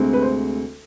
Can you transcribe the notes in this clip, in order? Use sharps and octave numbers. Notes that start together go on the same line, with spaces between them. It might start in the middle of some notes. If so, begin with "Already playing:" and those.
Already playing: D2 C3 G#3 C4
B4
C5